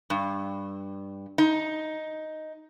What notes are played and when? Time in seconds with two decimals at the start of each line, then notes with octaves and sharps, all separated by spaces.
0.10 G2
1.38 D#4